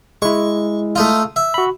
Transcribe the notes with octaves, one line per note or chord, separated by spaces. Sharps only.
G#3 E4 C#6
A3 D#4 F4
E5
F#4 B5